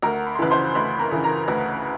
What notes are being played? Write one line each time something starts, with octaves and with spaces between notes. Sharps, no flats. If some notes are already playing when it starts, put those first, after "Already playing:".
D2 A#4 A#5
B5
C6
C#3 E3 B4 B5
C5 C6
D2 B4 B5
A#4 A#5
C#3 E3
A#4 A#5
D2 B4 B5